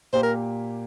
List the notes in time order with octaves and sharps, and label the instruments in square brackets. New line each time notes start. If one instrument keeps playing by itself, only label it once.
[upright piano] A#2 A#3 G4 [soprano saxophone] C5
[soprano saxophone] A#4